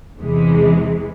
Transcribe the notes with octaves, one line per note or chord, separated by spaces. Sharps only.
E2 C3 E3 G#3